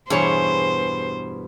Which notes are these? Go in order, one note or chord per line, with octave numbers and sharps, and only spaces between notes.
E2 G2 B2 G#4 C5 C#5